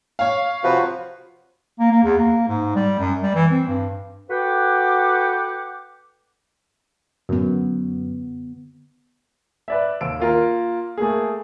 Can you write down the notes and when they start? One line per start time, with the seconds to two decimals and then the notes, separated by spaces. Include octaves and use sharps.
0.19 C#5 F5
0.64 C3 F3 F#4 B4
1.79 A#3
1.92 A#3
2.03 E2
2.19 A#3
2.48 G#2
2.75 G3
2.99 F#2
3.22 G3
3.35 E3
3.51 C4
3.68 G2
4.30 F#4 A4 B4 F#5 G5 D6
7.29 F#2 D3 B3
9.68 B4 D5 E5
10.01 D#2 E6 D7
10.20 A#3 F4 A#4
10.97 A3 A#3 G#4